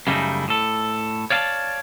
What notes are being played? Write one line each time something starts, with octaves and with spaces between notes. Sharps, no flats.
F#2 C#3 G3 A3 D#4 E4
A2 A4
C#5 D5 F5 G#5 A5